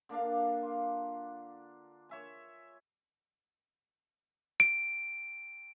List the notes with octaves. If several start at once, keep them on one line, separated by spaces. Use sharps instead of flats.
D3 A#3 D4 F5
F4
C#5 E5 G#5
D7